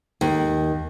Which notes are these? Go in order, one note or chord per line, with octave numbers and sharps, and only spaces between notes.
D#2